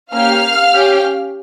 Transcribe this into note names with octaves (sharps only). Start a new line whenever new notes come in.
A#3 C#4 G4 F5 F6
C#4 G4